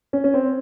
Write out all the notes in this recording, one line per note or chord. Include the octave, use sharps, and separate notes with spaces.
C#4
C#4
C4